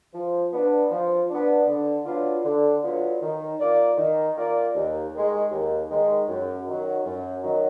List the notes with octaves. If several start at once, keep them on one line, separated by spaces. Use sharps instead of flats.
F3
B3 D4
F3
B3 D4
D3
F#3 B3 D4 F4
D3
F#3 B3 D4 F4
D#3
A#3 F4 A#4 D5
D#3
A#3 F4 A#4 D5
D#2
D#3 G#3
D#2
D#3 G#3
F#2
D#3 F#3
F#2
D#3 F#3